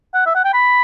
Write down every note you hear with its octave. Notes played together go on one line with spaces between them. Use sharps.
F#5
E5
F#5
G5
B5